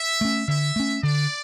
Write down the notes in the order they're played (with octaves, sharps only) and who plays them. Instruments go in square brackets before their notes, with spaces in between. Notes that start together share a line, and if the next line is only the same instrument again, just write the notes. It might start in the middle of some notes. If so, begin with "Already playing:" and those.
Already playing: [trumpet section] E5
[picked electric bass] A3 C#4
[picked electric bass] D3 [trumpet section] E5
[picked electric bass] A3 C#4
[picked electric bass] D3 [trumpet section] D5